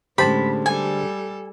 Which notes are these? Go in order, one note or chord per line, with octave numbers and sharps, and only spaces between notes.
A2 D3 G#3 C#4 G4 C5 A5 B5
G3 A4 G#5